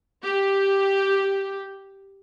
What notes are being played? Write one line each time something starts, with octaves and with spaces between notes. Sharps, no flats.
G4